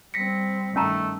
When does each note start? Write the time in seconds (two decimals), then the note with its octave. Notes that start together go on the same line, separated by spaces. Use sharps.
0.14 G3 C4 A#6 B6 C#7
0.76 G2 D#3 A3 C#4 A5 A#5